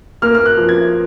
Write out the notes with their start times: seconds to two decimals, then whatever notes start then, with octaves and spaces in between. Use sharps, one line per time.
0.22 A#3 F6
0.35 F6
0.46 F#6
0.57 F3
0.69 G#6